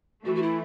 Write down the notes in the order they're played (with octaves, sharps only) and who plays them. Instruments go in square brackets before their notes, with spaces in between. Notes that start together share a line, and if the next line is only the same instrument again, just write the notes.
[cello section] E3 A3 [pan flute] F#4
[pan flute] F#4
E4